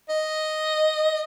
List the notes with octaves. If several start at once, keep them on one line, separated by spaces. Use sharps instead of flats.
D#5